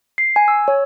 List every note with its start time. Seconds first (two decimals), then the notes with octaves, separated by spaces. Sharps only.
0.18 C7
0.36 G#5
0.48 E6
0.68 C#5